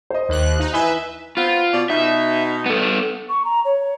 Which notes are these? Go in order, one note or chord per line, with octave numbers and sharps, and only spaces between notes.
C5 D#5
D#2 F#6
D#4
E3 B4 E5 G#5 G7
B3 C4 F4
B2 D5
B2 D#4 E5
B3 A4
C#6
A#5
C#5